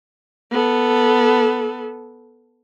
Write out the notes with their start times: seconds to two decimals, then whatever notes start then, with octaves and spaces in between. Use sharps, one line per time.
0.51 B3 A4